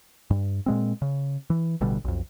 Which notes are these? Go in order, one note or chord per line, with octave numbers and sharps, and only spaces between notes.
G2
A#2 G#3 C4
C#3
E3
A1 B2 D3 G3
B1 F2